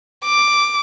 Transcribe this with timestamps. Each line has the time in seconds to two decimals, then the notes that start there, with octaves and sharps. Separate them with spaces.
0.25 D6